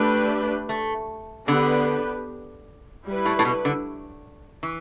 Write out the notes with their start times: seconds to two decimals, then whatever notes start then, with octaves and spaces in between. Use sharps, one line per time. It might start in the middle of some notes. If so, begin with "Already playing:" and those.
Already playing: A3 D4 G4 B4
0.69 A3
1.48 D3 B3 D4 G4 B4
3.05 G3 E4 B4
3.25 A2
3.39 A2
3.45 B2
3.65 D3
4.63 E3